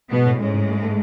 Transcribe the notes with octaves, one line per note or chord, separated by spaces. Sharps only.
B2 G#3 B3
A2
G#2 G#3 C#4
A2
A3
A3